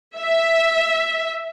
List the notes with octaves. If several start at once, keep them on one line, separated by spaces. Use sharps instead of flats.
E5